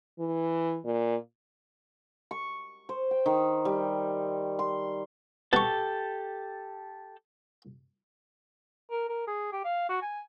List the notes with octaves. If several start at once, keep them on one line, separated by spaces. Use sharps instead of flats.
E3
A#2
C#6
C5
G5
D#3
G3
C6
B2 G4 A4 A5 C#6
A#4
A#4
G#4
G4
F5
F#4
G#5